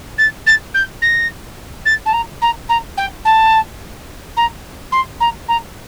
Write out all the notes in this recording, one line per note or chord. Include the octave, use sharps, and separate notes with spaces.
A6
A6
G6
A#6
A6
A5
A#5
A#5
A#5
G5
A5
A#5
C6
A#5
A#5